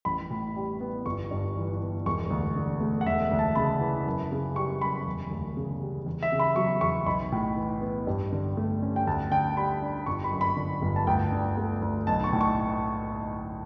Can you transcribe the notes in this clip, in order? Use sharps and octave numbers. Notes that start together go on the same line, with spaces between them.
A1 B5
A2
G3
B3
G1 C#6
G2
E3
B3
E1 C#6
D2
D3
A3
F#5
E1 E5
D2
A5
C#3 B5
E3
F#2
C#3
G3 C#6
F#2 B5
E1
D2
C#3
G3
E2
E5
C#3
B5
F#3 C#6
E2 C#6
B1 B5
A2
E3
B3
G2
D3
A3
C#4
G5
D2 A5
D3 G5
G3 B5
D4
G1 C#6
B5
F#2
B5
D3
G1
A5
D2 G5
D3
A3
D2
B1 A5
C#6
A2
C#6